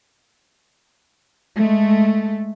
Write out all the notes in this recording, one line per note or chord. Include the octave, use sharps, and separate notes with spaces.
G#3 A3